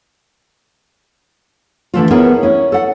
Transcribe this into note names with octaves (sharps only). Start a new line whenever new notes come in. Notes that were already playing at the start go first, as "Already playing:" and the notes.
D3 E3 A3 F4
B3 C#4 E4 G#4 A#4 B4
C#4 E4
A4 F#5